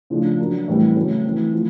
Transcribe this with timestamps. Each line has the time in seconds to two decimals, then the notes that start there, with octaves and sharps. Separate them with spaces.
0.10 C#3 F3 A3 D4
0.39 F#3 A#3 D4
0.68 A2 E3 G3 C4
0.96 C#3 F#3 A3 C#4
1.24 E3 A3 C4
1.53 F3 A3